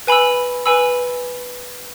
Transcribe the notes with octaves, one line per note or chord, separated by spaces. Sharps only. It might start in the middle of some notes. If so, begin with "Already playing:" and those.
B4 G#5 B5 E6
B4 G#5 B5 E6